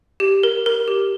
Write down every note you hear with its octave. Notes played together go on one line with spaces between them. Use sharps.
G4
A#4
A#4
G4